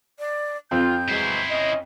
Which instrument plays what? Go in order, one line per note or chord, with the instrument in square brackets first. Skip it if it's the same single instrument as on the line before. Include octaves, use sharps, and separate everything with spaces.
[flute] D5
[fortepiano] F2 C4 [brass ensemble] F4 [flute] G6
[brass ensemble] E3 F#3 G#3 [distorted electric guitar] E4 C5
[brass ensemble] C#4 D#5